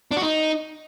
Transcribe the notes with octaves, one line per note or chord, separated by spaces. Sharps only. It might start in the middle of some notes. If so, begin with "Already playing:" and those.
D4
F#4
D#4